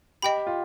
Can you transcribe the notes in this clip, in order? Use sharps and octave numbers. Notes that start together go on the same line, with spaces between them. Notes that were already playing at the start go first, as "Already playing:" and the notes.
G4 D#5 G5 B5
F4